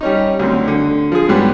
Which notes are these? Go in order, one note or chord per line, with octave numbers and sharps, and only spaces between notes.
G3 C#4 D#4
D2 F#3 C4
D3
F3 G#4
G#2 F#3 G3 B3